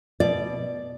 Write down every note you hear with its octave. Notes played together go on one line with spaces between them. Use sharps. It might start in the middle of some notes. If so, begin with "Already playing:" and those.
B2 D5